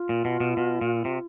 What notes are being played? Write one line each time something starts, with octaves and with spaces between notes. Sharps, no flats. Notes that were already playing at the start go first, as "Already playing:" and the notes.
Already playing: F4
A#2
B2
B2
B2
A#2
C3